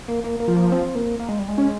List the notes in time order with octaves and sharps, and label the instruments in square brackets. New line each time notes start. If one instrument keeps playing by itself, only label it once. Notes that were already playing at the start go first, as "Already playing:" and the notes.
[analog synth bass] A#3
A#3
A#3
[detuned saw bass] F3
[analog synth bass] A#3
C4
A#3
A#3
G#3
G3
G#3
[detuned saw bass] C#4